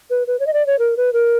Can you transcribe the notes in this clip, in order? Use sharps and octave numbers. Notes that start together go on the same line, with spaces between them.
B4
B4
C#5
D#5
D5
C#5
A#4
B4
A#4